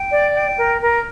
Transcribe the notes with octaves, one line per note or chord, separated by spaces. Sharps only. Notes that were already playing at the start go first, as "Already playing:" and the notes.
Already playing: G5
D5
G5
A#4
A#4